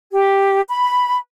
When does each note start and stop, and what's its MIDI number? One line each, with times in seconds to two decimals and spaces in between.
0.12 0.60 67
0.69 1.15 83